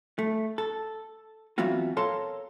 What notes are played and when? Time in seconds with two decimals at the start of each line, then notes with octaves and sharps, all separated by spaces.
0.19 A3
0.58 A4
1.58 E3 F#3 B3 C4 F4 F#4
1.97 A4 A#4 C#5 F5 A5 C6